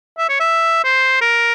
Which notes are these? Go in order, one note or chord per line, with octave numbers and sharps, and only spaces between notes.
E5
C#5
E5
C5
A#4